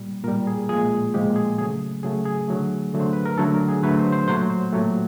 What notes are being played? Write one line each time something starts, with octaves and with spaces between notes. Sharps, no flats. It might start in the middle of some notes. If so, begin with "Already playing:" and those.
Already playing: A#2 G3
A#2 G3 A#4
G#4
A#2 F3 G#3 G#4
A#2 F3 G#3 G4
G#4
C#3 F#3 A3 G#4
C#3 F#3 A3 G#4
G#4
D3 F#3 A3
D3 F#3 A3
C5
B4
A#4
D3 F#3 A3 A4
A#4
G#4
D3 F#3 A3 B4
C5
C5
A#2 F#3 A3 C5
C5
A#2 F#3 A3 G4